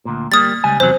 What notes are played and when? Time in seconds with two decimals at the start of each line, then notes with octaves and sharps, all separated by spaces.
0.05 D2 A#2
0.32 G3 A#3 D#6 A6
0.64 C#2 G3 G#5
0.80 E2 C3 F#3 C5